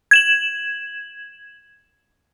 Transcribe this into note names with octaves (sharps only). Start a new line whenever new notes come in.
G#6 E7 F#7